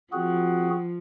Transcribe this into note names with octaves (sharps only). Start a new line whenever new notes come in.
F3 C4 F#4 G#4 F#5